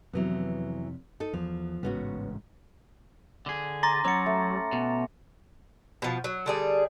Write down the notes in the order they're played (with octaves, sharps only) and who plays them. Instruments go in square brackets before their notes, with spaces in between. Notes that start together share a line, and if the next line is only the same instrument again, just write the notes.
[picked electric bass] F2 C3 [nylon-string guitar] E3 F#3 B3
[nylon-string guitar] D#4 A4
[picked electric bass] E2 [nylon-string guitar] F3
[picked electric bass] A1 G#2 C#3 [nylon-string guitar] B3 C#4 F#4
[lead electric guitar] D3 G#4
[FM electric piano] A#5 A6 [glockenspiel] C6 D6 A#6
[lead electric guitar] F#3 [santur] C#4 F#5 [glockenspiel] D6 C#7
[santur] A3
[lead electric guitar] B2
[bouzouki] B2 F3
F#3
D3 G3 G#4